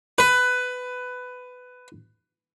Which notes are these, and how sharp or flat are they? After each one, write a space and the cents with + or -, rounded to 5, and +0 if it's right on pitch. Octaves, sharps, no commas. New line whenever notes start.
B4 +15